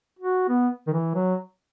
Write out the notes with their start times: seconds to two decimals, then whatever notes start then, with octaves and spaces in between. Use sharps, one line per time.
0.19 F#4
0.48 B3
0.87 D#3
0.93 E3
1.15 F#3